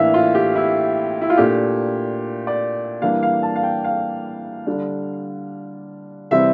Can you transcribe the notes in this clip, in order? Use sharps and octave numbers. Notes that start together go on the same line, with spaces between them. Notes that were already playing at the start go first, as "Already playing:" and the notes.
Already playing: A2 E3 A#3 D4 E5 F5
F4
G4
E4
E4
F4
A#2 A3 D4 G4
D5
E3 G3 A#3 D4 F5
F5
A5
F5
G5
F5
D3 G3 D4
C3 E3 G3 C4 E5